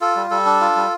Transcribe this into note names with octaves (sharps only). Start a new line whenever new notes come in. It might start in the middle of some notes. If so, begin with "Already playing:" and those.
F4 A4
G3
G3 A4
D4
F4
G3